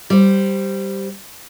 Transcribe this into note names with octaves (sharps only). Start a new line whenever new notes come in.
G3 C5